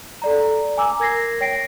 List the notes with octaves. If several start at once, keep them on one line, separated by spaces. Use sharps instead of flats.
A4 D5 A#5
G#5 A#5 D6 E6
A#4 G#6 A#6 C7
C#5 G5 A#6 C7 D7